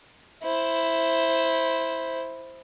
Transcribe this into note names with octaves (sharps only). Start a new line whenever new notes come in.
E4 C5